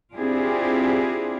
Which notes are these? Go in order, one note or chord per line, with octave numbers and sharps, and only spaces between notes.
C4 D4 E4 F4 G4 G#4